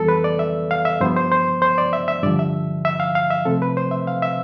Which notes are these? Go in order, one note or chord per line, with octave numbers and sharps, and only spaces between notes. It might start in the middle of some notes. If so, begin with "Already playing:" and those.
Already playing: F2 E3 G3 B3 A4
B4
D5
E5
F5
E5
G2 F3 B3 C5
C5
C5
C5
D5
E5
E5
G2 D3 F3 D5
E5
E5
F5
F5
E5
C3 F3 A3 C4 A4
B4
C5
E5
F5
E5